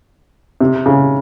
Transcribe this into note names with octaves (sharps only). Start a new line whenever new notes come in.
C3
C#3